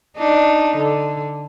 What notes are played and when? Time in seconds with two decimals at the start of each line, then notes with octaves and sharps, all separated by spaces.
0.17 D4 D#4
0.77 D3